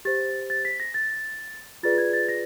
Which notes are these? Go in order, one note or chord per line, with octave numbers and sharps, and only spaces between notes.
G4 C5 A6
A6
B6
A#6
A6
F4 G#4 B4 D5 A6
G#6
A6
A#6